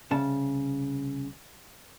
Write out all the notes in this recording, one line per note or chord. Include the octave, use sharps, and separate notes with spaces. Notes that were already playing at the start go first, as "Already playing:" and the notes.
C2 C#3 A5